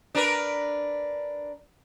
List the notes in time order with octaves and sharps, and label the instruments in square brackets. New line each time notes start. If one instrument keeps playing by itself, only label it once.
[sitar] D4 A#4 B4